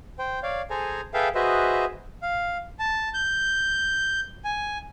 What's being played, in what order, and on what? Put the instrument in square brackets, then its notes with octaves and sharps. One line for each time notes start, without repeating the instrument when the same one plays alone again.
[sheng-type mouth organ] C5 G5
C#5 D5 F5
G#4 A4 C5 G#5 A#5
G#4 A4 B4 E5 F5 G5
F#4 G#4 B4 C5 D#5 E5
F5
A5
G6
G#5